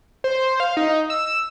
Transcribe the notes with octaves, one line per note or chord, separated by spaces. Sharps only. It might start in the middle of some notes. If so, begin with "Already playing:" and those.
C5
F5
D#4
E6